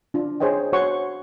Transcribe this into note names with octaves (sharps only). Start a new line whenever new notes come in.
D4 F4
G#4 C5 C#5 D#5 G5
F#4 C5 C#5 F#5 C6 C#6